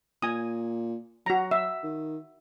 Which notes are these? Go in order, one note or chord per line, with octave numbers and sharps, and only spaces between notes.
A#2 G#5 D#6
F#3 F#4 A#5
E5
D#3